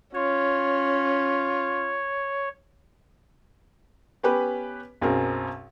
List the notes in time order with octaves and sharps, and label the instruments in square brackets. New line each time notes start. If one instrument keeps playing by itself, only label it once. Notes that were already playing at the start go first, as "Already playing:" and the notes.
[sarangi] C#4 [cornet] F4 [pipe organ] C#5
[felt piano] B3 C#4 G4 B4
B1 F#2 C4 G#4 A#4